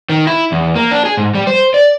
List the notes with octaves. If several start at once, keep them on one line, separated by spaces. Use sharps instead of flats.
D#3
E4
E2
A#3
D4
G#4
G#2
G3
C5
D5